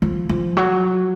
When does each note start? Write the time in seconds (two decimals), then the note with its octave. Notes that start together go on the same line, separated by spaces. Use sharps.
0.02 F3
0.29 F3
0.57 F#3